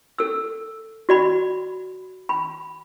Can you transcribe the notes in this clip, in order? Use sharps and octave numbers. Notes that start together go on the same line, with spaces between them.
A4 E6
F#4 D5 B5
B5